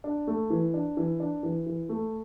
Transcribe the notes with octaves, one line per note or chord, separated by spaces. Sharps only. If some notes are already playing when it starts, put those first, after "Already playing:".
D4
A3
E3
D4
E3
D4
E3
E3
A3